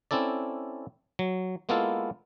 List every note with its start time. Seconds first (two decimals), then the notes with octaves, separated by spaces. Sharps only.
0.11 C4 C#4 E4 A4 D5
1.19 F#3
1.69 G#3 A#3 B3 E4 F4 A4